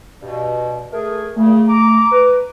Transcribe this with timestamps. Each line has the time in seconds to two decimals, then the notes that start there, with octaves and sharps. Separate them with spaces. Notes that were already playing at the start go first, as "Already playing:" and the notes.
0.22 G2 B2
0.92 A3 G#4 A#4
1.36 A#2 C#3 A3
1.68 A#5 D6
2.11 B4